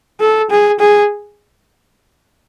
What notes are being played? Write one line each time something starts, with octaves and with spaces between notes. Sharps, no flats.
A4
G#4
G#4